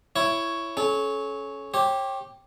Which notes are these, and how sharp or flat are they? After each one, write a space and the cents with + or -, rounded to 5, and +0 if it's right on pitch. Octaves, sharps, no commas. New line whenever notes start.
E4 +15 C#5 +0
C#4 +0 A4 -35
G4 +0 C#5 -40